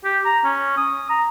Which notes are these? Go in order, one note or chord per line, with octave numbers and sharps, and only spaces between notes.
G4
A#5
C#4
D#6
A#5